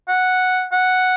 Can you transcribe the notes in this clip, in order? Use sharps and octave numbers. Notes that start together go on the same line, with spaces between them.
F#5
F#5